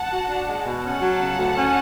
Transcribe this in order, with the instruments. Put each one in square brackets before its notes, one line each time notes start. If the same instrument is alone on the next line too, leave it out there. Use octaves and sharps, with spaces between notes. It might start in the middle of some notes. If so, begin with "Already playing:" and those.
Already playing: [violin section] F#5 A5
[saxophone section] F#4
D4
G#3
B2
[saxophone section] C#4 [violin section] F#5 A5
[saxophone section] F#3
C#3
D2
C#4